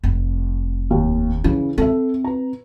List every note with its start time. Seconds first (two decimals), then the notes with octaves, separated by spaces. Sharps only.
0.04 F1
0.90 D#2
1.44 C#3 E3
1.78 C4 A4 E5
2.24 B4 A#5